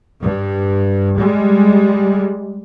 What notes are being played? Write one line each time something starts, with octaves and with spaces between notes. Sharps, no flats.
G2
G3 G#3